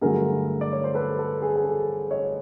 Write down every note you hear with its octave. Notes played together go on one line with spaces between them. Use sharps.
G2 D3 F#3 A3 G#4 A#4
D5
C#5
C5
A4 B4
A4
G#4
A4
G#4
A4
C#5 D#5